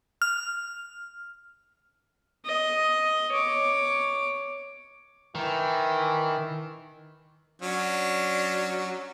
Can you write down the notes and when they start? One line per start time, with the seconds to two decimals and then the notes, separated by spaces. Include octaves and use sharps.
0.22 F6
2.45 D#5
3.32 C#5 D6
5.35 D#3 E3
7.61 F#3 C#4 D4